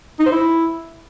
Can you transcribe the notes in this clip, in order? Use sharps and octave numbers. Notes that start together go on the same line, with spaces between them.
D#4
C5
E4